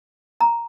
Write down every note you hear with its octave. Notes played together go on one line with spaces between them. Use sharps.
A#5